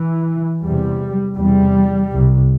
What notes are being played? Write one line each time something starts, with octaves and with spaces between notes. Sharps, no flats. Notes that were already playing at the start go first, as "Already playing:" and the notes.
Already playing: E3
E2 C3 G3
E2 C3 G3
C2 C3